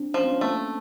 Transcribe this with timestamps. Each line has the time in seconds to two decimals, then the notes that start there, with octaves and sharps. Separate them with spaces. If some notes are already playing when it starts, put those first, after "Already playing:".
Already playing: C4 D4
0.14 F3 C#4
0.24 C4
0.32 B3 C#4
0.41 A3 A#3 C4